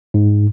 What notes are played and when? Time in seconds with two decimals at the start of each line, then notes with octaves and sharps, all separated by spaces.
0.14 G#2